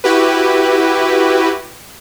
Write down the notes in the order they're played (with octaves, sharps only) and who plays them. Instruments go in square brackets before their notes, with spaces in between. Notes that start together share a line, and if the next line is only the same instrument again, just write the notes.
[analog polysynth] E4 F#4 G4 B4